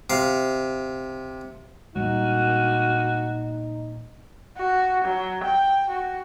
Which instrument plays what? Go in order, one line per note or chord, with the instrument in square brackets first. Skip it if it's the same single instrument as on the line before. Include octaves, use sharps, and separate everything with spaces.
[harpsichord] C3 F5
[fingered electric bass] A#2 G3 G#3 [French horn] D#4 [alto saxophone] F#4
[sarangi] F#4
F#3
G5
F#4